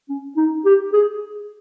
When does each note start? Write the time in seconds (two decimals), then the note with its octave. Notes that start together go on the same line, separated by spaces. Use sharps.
0.09 C#4
0.37 D#4
0.65 G4
0.93 G#4